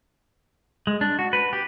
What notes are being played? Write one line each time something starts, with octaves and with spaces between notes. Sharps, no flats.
G#3
D4
F#4
B4
G4